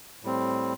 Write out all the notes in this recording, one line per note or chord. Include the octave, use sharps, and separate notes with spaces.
A2 G3 C4